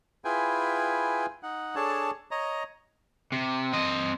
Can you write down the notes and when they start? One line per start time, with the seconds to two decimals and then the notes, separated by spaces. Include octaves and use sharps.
0.25 E4 F4 G#4 B4 G5 G#5
1.43 D#4 F#5
1.75 D4 G#4 A4 C#5 A5
2.31 C#5 D#5 A#5
3.32 C3
3.73 C4 D#5